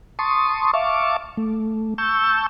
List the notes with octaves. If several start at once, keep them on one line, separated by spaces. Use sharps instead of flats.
A5 C6 C#6 D#6
E5 F5 A5 C#6 D6
A3
A5 C#6 E6 G6